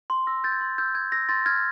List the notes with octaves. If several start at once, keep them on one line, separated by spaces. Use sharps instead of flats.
C6
E6 A#6
G6 A6
G#6
C6
E6 G6
G6 G#6
E6 A#6
C6 A6
F6 G#6